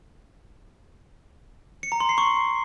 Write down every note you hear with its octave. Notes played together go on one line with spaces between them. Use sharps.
C#7
A#5
C6
C7
C#6